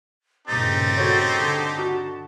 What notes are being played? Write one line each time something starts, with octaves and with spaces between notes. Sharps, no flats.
G2 A#2 C#3 C4 D#4 G4 A6
F#4 A4 C#5
D3 A5
F#4